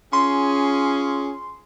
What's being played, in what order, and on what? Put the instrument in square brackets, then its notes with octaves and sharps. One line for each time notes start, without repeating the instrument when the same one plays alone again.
[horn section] C#4 F4 G#4 [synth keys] C6